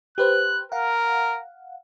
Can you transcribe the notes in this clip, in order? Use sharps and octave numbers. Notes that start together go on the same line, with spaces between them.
G4 B4 C5 F#6
A#4 F5 F#5